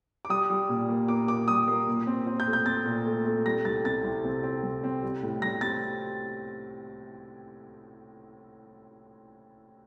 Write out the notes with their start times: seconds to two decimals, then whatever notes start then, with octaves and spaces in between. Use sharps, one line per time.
0.25 D6
0.30 G3 D#6
0.50 G3
0.69 A#2
0.89 A#3
1.08 A#3 D6
1.28 A#3 D6
1.48 G3 D#6
1.68 A#3
1.88 A#2
2.07 C4
2.27 C4
2.40 G6
2.47 A3
2.53 G6
2.66 C4 A6
2.85 A#2
3.05 A3
3.25 A3
3.45 G3 A#6
3.65 C2 A6
3.85 C3 A6
4.04 C2
4.24 C4
4.43 C4
4.63 C2
4.84 C4
5.02 G3
5.23 A2
5.42 G3 A#6
5.61 C4 A6